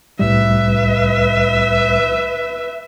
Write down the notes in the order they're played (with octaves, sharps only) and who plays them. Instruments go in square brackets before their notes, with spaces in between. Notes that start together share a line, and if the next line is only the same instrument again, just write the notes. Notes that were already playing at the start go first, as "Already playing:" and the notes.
[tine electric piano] C2 A2 G3 [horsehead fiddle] B4 E5